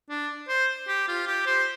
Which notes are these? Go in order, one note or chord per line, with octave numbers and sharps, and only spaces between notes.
D4
C5
G4
F4
G4
C5